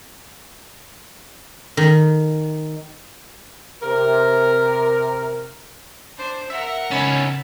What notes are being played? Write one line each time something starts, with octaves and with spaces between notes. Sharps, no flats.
D#3
C3 A#4
D4 C5
A#4 E5 F#5
C#3 C#4 D#4 B5 E6 A6